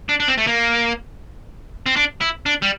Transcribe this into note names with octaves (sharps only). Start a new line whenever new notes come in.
D4
D4
C4
A3
A#3
C4
D4
E4
D4
G3